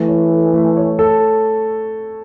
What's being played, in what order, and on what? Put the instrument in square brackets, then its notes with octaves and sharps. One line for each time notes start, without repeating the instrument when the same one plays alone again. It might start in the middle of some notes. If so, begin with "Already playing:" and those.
Already playing: [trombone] E3 [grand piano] A3
[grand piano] C#5
A4
A3
C#5
A4